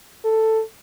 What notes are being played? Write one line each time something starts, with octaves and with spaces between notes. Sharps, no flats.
A4